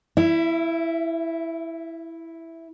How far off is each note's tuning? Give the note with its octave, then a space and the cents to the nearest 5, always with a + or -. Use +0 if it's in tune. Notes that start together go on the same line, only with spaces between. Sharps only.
E4 +0 E5 +40